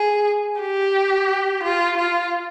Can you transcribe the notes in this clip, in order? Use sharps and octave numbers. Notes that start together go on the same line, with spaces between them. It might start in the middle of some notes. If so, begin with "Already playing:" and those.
Already playing: G#4
G4
F4
F4